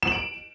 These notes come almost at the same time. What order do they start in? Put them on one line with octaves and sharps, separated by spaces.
E7 F#7 D7